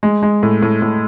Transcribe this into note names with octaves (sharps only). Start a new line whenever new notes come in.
G#3
G#3
A2
A2
A2